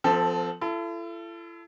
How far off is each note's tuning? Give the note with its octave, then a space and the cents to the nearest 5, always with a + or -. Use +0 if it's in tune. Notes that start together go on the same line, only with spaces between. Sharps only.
F3 +0 C4 -30 A4 +0
E4 +45 A4 +0